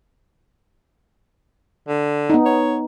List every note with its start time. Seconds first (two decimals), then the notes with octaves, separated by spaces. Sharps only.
1.88 D3
2.30 B3 D#4
2.45 C#5